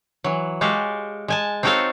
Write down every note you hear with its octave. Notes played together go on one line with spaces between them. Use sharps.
E3 F#3
G#3 F#4 G4 A4 F5
G#3 G#5 A5
C4 D#4 F#4 A4 C#5 F5